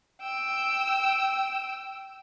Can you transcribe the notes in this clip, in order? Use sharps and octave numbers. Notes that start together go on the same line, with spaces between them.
G5 E6